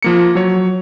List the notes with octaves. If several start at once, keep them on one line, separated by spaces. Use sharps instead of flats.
F3 A#3 C#7
F#3 C#5